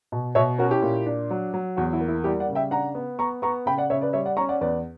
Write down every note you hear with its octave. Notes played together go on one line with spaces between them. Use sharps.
B2
B2 C#5 E5
C#4 F#4 A#4
E4 G4
A#2
D4
F#3
F#3
E2 F#4
E4
A#3
E4
G3 E4 G4
D5 F#5
C#3
E5 G5
D4 F#5 A#5
B3
B3 A#5 C#6
B3 A#5 C#6
C#3 G5 B5
D5 F#5
C#3 C#5 E5
B4 D5
G3 C#5 E5
D5 F#5
C#4 A#5 C#6
D5 F#5
E2 B4 D5